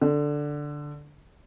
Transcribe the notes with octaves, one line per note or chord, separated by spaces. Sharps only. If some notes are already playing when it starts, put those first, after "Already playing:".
D3